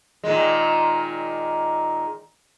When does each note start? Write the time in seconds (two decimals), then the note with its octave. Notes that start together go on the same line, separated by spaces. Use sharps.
0.24 A#2 D#3 G#3